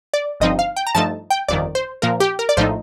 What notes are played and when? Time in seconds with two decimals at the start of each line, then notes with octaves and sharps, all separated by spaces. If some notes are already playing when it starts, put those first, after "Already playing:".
0.14 D5
0.40 G1 G2 F3 C4 D#4 D#5
0.59 F5
0.76 G5
0.87 A#5
0.95 G2 F3 A3 D#4 A5
1.30 G5
1.48 G1 F2 D#3 D5
1.75 C5
2.02 A#2 F3 A#3 A#4
2.20 G4
2.39 A#4
2.49 D5
2.57 A#1 A2 F3 A3 D#4 C5